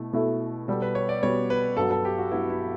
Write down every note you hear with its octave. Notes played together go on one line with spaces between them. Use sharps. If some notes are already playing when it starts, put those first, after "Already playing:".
Already playing: B2 A3 E4
B2 A3 E4 A4 E5
B2 G3 B3 F#4 A4
B4
C#5
D5
B2 G3 B3 F#4 C#5
B4
G2 F#3 B3 A4
A4
G4
F#4
G2 F#3 B3 E4
E4